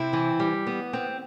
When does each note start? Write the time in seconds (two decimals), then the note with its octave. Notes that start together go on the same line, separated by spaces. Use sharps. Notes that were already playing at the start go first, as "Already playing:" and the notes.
Already playing: C3 C4 E4
0.13 E3
0.40 G3
0.67 B3
0.93 C4